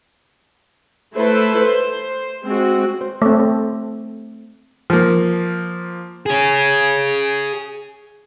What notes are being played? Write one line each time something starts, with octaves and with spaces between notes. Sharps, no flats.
A3 E4 A4 B4 C5
C5
G#3 C4 F#4
C5
A3 C4
A4
F3 A#3
G#4 C#5